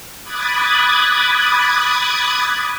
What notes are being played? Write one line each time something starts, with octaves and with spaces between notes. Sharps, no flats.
B5 D6 D#6 F#6 G#6 A6